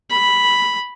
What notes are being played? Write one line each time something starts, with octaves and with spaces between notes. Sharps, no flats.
B5